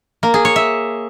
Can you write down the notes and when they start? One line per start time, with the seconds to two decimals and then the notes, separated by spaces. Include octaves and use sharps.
0.23 A#3
0.34 G#4
0.45 C#5
0.56 E5